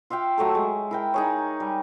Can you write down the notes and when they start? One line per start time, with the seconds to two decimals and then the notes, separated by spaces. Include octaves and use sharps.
0.10 F4 E5 F5 G5
0.38 F#3 A3 A4
0.55 G#3
0.91 E4 A#4 G5
1.14 D#4 G#4 C#5
1.60 G3